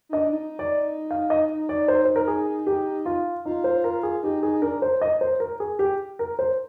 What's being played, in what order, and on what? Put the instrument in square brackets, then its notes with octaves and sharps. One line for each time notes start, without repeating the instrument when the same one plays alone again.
[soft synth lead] D#4
[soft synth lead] D4 [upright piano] D#5
[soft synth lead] D#4
[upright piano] D5
F5
D#5
D5
C5
C5
A#4
G#4
G4
F4
[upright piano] D#4 [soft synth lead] F4
[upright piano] C5
A#4
G#4
[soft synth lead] D#4 [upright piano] G4
[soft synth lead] D#4 [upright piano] G#4
[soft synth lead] D4 [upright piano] A#4
[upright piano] C5
D#5
C5
A#4
G#4
G4
A#4
C5